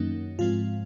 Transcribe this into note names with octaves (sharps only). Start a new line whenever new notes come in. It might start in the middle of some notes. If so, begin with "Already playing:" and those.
Already playing: F#2 D#3 F#3 A#3 C#4 D#4
G#2 F3 G#3 C4 F4